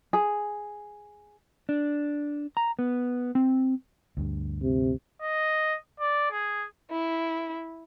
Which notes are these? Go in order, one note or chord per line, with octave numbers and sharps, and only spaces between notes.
G#4
D4
A#5
B3
C4
D2 G2
C3
D#5
D5
G#4
E4